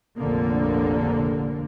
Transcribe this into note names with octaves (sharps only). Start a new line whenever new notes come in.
F1 A#1 D3 A#3